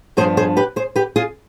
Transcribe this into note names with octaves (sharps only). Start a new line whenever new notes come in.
G2 F3 B3 D4 G#4 C5
G#4 C5
G4 B4
G#4 C5
G4 B4
F4 G#4